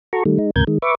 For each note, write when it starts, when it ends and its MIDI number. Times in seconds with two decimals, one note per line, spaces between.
0.13 0.23 66
0.13 0.23 69
0.13 0.23 82
0.13 0.23 85
0.25 0.38 51
0.25 0.38 55
0.25 0.38 57
0.38 0.50 56
0.38 0.50 63
0.56 0.64 38
0.56 0.64 44
0.56 0.64 48
0.56 0.64 70
0.56 0.64 91
0.56 0.64 92
0.67 0.78 51
0.67 0.78 56
0.82 0.95 71
0.82 0.95 76
0.82 0.95 85
0.82 0.95 86